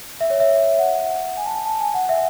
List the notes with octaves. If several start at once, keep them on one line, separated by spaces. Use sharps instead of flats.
E5
C#5
E5
F#5
G#5
A5
A5
G#5
F#5
E5